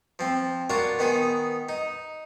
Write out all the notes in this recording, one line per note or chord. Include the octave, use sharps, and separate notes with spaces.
F3 C4
D4 F4 F#4 A#4 C#5
D#3 B3 D#4 G#4
D#4